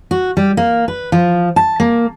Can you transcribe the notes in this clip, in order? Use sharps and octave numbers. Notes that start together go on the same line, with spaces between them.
F#4
G3
A#3
B4
F3
A5
A#3